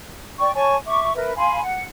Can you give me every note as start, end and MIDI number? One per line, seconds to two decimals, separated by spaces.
0.39 0.54 74
0.39 0.54 79
0.39 0.54 85
0.54 0.75 73
0.54 0.75 80
0.54 0.75 81
0.54 0.75 85
0.86 1.13 76
0.86 1.13 85
0.86 1.13 86
1.15 1.32 70
1.15 1.32 71
1.15 1.32 76
1.36 1.60 77
1.36 1.60 80
1.36 1.60 83
1.36 1.60 84
1.61 1.85 78